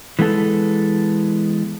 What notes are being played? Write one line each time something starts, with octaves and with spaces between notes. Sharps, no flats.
E3 G#3 B3 E4 A4